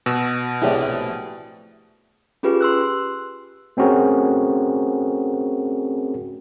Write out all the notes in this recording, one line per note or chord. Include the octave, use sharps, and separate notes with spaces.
B2 E6
A#1 A2 C3 E4 G#4 D5
C#4 F4 G4 G#4 B4
C6 E6 F#6
A3 C4 C#4 F#4 G#4 A#4